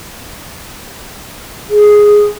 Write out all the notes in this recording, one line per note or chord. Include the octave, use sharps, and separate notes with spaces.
G#4